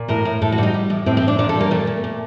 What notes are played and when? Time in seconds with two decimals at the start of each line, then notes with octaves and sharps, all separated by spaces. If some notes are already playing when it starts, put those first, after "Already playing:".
Already playing: A#2
0.08 A2 A#4
0.25 A2
0.42 A2 A4
0.52 F#4
0.58 G3 D#4
0.74 G3
0.90 A2
1.06 A2 C4
1.17 C4
1.22 A2
1.28 D4
1.39 A#2 D4
1.49 A4
1.55 G3
1.61 A#3
1.71 A#2 A3
1.87 A#2
2.04 A#2